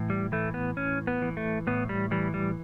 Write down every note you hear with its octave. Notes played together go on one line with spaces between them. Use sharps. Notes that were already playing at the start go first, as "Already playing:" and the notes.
Already playing: A2 E3
G3
E3 A3
B3
A2 C#4
B3
E3
A3
A2 B3
G3
E3 G3
G3